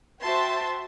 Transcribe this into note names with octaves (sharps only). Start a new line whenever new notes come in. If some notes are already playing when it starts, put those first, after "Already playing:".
F#4 C5 E5 G5 A5 C6